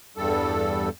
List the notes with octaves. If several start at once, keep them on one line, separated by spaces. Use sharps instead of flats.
E2 G2 G3 A4